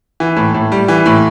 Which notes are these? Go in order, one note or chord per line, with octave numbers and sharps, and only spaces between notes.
E3
A2
A2
G3
E3
A2